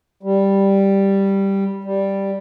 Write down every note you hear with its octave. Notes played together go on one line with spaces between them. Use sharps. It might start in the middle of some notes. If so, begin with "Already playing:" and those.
G3
G3